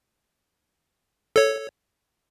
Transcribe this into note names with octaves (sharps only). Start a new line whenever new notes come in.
A4 C#5